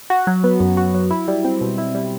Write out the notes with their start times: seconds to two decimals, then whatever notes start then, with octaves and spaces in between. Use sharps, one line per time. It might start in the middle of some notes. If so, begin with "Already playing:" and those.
0.10 F#4
0.27 F#3
0.44 B3
0.60 F#2
0.77 F#4
0.95 F#3
1.11 E4
1.28 G3
1.45 C4
1.61 B2
1.78 E4
1.95 G3